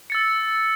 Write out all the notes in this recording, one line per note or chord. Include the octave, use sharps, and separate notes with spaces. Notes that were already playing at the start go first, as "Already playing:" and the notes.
E6 A6 C#7